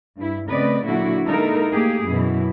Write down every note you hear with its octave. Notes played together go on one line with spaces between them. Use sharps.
G2 E4
C#3 A3 C4 B4 D5 D#5
A#2 D3 F#3 D4 E4 F#4
G#3 A#3 D#4 E4 A4 A#4
A3 A#3 G4 G#4
F#2 B2 E3 E4